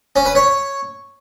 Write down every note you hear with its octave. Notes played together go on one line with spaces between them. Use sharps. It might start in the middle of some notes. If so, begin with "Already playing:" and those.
C#4
B4
C#5